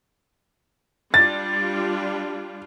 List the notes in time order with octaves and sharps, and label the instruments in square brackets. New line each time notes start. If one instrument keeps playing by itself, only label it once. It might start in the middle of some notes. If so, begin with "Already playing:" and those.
[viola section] G3 D4 F4 [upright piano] A6